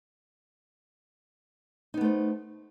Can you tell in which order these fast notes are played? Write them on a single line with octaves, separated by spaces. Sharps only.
D#4 B3 A3 C5